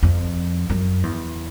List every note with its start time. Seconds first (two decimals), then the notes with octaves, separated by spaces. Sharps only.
0.03 F2
0.70 F#2
1.03 E2